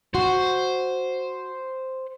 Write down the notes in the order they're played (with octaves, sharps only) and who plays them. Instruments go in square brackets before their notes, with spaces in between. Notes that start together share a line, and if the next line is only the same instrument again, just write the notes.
[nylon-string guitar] F#4 [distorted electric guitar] C5